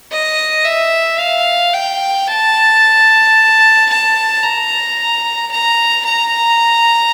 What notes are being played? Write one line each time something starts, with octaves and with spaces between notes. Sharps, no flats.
D#5
E5
F5
G5
A5
A5
A#5
A#5
A#5